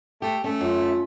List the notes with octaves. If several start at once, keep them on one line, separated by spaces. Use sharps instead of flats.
A3 G4
A3 C#4
F#2 F4